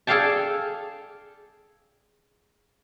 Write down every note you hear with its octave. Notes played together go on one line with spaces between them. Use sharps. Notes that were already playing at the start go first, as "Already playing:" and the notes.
G#4 A4 D5 F5 G5 A5